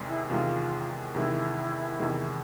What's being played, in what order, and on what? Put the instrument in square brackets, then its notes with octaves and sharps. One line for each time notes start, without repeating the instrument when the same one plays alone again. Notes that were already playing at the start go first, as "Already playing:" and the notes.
Already playing: [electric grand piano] E2 C3 D#3 G#3
[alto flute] E4
[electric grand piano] E2 C3 D#3 G#3 [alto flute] F4
[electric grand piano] E2 C3 D#3 G#3 [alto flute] E4
[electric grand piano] E2 C3 D#3 G#3